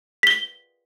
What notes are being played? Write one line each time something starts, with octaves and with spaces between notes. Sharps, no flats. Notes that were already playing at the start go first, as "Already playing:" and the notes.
B6 G7